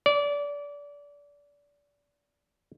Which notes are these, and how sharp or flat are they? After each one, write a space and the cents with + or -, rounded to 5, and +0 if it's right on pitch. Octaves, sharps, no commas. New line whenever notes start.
D5 -25